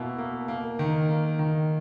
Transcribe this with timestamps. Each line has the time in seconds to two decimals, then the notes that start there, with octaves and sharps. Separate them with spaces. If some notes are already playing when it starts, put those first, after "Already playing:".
Already playing: B2 A#3 E4
0.18 A#3
0.48 A#3
0.79 D#3
1.09 A#3
1.39 D#3